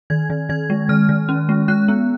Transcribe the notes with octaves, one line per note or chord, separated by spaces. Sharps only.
D#3 G#6
D#3
D#3 G#6
G#3
D#3 F6
D#3
C#4
G#3
G#3 F#6
B3